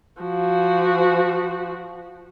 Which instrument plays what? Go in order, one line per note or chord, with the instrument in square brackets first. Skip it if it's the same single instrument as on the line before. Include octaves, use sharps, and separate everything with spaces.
[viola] F3 F#4